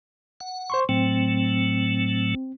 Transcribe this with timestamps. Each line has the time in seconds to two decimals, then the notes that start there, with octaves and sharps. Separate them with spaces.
0.41 F#5
0.70 C5 C6 C#6
0.89 A2 F#3 A3 C4